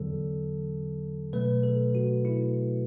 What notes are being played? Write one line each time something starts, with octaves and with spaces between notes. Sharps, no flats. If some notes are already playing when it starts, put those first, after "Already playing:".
Already playing: E2 D3 F#3 A4
B2 F#3 A3 B4
A4
F#4
E4